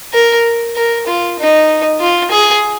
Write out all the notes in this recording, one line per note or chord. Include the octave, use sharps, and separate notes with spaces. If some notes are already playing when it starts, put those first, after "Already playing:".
A#4
A#4
F4
D#4
F4
G#4